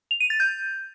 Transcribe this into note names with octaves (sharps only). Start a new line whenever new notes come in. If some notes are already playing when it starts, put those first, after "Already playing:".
F7
D#7
A6
G6